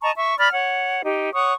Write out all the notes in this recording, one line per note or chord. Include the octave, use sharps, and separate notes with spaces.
D#5 A5 A#5 C#6
E5 C#6
D5 B5 F6
C#5 F#5
D#4 G4
C#5 F#5 C#6 D#6